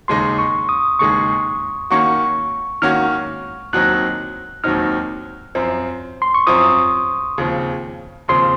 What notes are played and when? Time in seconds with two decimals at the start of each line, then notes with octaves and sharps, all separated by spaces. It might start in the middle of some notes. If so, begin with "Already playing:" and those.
0.08 D#2 C#3 G#3 D#4 G#4 C6
0.39 C#6
0.69 D#6
0.99 D#2 C#3 G#3 D#4 G#4 C#6
1.90 D#3 A#3 C#4 F#4 C#6
2.82 D#3 A#3 C#4 F#4 F6
3.73 D#2 D#3 F#3 C4 D#4 F#6
4.64 D#2 D#3 F#3 C4 D#4 F6
5.55 F#2 F3 C4
6.22 C6
6.34 C#6
6.47 F#2 F3 C4 D#6
7.38 D#2 C#3 F3 C4
8.28 D#2 C#3 F3 C4 C6